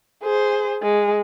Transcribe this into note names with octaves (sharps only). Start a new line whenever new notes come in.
G#4 C5
G#3